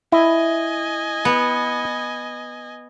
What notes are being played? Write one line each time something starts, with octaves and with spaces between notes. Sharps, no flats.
E4 D#5 G#5
B3